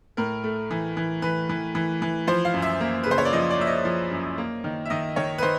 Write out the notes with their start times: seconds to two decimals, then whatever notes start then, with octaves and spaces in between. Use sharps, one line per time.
0.17 A2 A#4
0.44 A3
0.71 E3
0.97 E3
1.22 E3 B4
1.49 E3
1.75 E3
2.02 E3
2.27 F3 C5
2.45 F5
2.54 F#2
2.62 E5
2.80 A#3
3.03 C#3 B4
3.11 C5
3.18 C#5
3.25 D5
3.33 F3 D#5
3.51 D5
3.59 A#3 E5
3.67 D#5
3.85 F3
4.11 F#2
4.38 A#3
4.64 D#3
4.85 E5
4.90 D#3 D#5
5.16 D#3 C#5
5.38 B4
5.43 D#3 C5